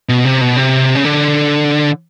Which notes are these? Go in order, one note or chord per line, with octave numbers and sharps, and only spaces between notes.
B2
C3
B2
C3
C#3
D3